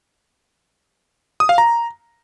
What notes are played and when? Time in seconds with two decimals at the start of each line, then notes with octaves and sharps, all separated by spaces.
1.40 D#6
1.49 F5
1.58 A#5